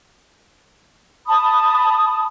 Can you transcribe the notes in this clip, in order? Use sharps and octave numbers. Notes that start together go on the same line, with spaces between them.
A5 B5 D#6